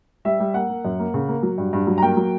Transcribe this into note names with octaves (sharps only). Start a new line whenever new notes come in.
G3 E5
G3
A#3 F#5
A#3
F#2
A#3
C#3
A#3
F#3
G2
G2
F#3
A#5
A#3 G5
F#3